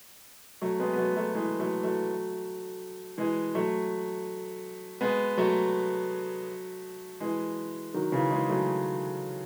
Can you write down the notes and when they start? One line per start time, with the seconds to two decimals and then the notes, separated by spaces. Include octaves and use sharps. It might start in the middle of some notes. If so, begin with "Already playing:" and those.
0.62 F#3 A3
0.80 G#3 B3
0.93 B3
0.98 F#3 A3
1.16 F#3 A3
1.35 E3 G#3
1.59 F#3 A3
1.83 F#3 A3
3.18 E3 G#3
3.55 F#3 A3
5.01 G#3 B3
5.37 F#3 A3
7.20 E3 G#3
7.94 D#3 F#3
8.12 C#3 E3
8.31 E3 G#3
8.49 F#3 A3